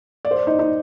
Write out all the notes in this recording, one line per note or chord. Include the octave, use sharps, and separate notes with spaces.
D5
C5
D5
D#4
D#4